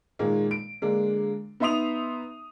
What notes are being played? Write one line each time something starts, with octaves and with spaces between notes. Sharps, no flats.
A#2 D#3 G#3 A#3
D7
D3 G#3 A#3 D4
B3 D#4 E5 C6 D#6 F7